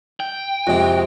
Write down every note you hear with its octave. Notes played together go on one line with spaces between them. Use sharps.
G5
F2 C3 G#3 F#4